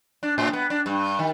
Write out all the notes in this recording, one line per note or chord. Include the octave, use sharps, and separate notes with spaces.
D4
A2
B3
D4
G2
D#3